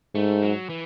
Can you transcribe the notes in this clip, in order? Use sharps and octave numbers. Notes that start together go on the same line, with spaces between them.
G#2 A3
F#3
E3